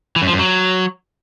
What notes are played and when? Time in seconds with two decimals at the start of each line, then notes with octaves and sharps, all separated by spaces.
0.16 E3
0.22 F#2
0.28 F3
0.33 F#2
0.39 F#3